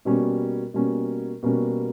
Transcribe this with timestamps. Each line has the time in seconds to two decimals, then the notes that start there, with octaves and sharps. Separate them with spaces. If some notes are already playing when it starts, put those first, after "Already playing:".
0.05 B2 G3 A#3 C#4
0.74 B2 G3 A#3 C#4
1.43 B2 G3 A#3 C#4